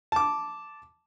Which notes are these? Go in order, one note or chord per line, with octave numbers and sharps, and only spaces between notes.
A5 D6